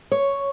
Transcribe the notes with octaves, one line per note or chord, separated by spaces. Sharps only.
C#5